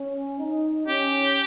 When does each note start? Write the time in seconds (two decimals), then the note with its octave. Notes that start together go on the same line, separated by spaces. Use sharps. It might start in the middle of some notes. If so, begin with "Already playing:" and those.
Already playing: C#4
0.39 D#4
0.87 C#4 G4